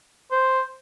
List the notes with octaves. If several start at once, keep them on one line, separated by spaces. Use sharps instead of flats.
C5